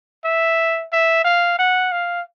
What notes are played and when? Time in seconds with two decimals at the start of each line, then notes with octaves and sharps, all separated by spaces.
0.25 E5
0.92 E5
1.24 F5
1.59 F#5
1.92 F5